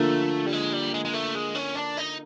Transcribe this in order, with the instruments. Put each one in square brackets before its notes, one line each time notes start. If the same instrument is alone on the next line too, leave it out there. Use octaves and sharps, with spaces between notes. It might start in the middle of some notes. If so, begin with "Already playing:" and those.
Already playing: [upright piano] D3 F3 A#3 [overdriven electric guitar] A3
[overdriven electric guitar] G3
G#3
G3
G#3
G#3
A3
G#3
C#4
D4
D#4